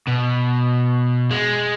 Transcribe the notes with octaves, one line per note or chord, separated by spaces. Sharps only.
B2
G#3